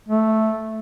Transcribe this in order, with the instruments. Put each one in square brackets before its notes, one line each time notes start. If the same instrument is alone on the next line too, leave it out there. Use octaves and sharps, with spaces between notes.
[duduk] A3